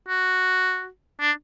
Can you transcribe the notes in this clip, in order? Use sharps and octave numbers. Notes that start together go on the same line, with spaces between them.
F#4
D4